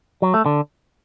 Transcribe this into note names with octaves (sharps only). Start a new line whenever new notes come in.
F#3
A3
D3